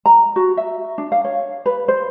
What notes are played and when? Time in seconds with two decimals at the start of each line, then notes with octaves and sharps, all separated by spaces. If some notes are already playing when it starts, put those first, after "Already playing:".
0.06 A#5
0.36 F#4
0.57 E5
0.98 D4
1.12 F5
1.25 C#5
1.66 B4
1.88 C5